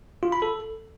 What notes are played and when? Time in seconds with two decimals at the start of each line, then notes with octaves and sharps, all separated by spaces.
0.23 F4
0.32 B5
0.42 A4